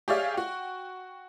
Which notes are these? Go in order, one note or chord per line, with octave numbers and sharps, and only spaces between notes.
G4 G#4 C#5 D5 E5 F5
F#4 G5